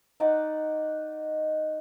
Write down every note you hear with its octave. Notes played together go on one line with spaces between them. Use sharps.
D#4 D5 F#5 D6